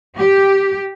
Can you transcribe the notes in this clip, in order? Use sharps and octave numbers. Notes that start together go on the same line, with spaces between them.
G4